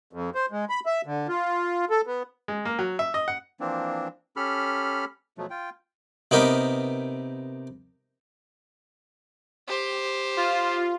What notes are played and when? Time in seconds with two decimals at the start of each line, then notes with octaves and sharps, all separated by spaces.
0.13 F2
0.35 C5
0.52 G#3
0.69 B5
0.86 E5
1.06 D3
1.28 F4
1.90 A4
2.07 B3
2.48 G#3
2.65 A#3
2.79 F#3
2.99 E5
3.14 D#5
3.28 F#5
3.60 E3 F3 A#3 C4 D4
4.36 C#4 G4 A4 B5 F6
5.38 B2 F3 F#3 A3
5.50 F4 G5
6.31 C3 B3 D#4 G4 A#4 B4
9.68 G4 C5
10.37 F4